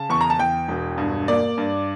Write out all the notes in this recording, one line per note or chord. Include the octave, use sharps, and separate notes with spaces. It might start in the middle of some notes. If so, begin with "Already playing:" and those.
Already playing: C#3 A5
E2 C#6
A#5
A5
E2 G5
E1
G2
A#3 D5
G2